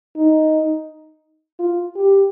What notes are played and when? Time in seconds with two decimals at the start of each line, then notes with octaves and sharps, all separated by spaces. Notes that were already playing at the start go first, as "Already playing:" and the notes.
0.17 D#4
1.59 F4
1.96 G4